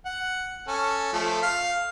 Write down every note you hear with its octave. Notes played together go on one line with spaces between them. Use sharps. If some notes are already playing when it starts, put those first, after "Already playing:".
F#5
C#4 A4
F3 A3
F5